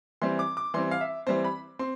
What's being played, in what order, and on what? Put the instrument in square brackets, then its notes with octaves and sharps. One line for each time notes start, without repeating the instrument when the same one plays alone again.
[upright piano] E3 G3 C4 C6
D6
D6
E3 G3 C4 C6
F5
E5
E3 G3 C4 C5
B5
C4 C6